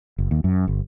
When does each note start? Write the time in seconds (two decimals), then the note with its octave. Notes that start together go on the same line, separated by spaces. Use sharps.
0.18 F#1
0.31 D#2
0.44 F#2
0.67 G1